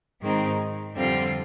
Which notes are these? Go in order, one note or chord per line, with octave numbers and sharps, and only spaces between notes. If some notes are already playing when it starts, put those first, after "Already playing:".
G#2 D#3 G#3 C4 D#4
F2 D3 G3 C4 F4